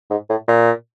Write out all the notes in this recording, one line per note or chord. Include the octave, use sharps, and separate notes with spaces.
G#2
A2
A#2